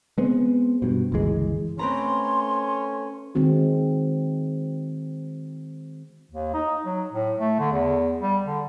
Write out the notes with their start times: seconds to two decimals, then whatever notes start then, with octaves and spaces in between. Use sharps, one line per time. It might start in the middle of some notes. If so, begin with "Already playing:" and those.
0.18 G#3 B3 C4
0.82 G2 B2
1.12 G1 C#2 E3 G#3
1.79 A3 C4 C#4 B4 A#5 C6
3.35 D#3 G#3 C4 F#4
6.31 D#2
6.54 D#4
6.85 F#3
7.13 A2
7.39 A3
7.59 D3
7.72 E2
8.21 G3
8.46 D3